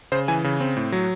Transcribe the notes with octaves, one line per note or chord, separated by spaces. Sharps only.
C#3 C5
E3 G#5
C#3
C4
A2
F#3